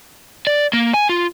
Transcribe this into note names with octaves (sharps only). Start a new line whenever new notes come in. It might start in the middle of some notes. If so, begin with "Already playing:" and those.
D5
A#3
G#5
F4